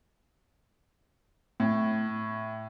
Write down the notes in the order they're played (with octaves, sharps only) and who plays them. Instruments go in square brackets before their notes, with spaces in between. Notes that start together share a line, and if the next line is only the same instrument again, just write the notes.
[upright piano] A2